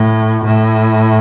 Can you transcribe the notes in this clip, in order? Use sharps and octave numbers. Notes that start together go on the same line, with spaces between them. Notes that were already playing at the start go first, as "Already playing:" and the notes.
Already playing: A2
A2